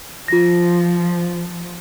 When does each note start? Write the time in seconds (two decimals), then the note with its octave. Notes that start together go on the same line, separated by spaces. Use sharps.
0.28 F3 F4 A#6